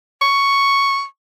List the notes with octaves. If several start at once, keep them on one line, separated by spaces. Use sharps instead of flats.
C#6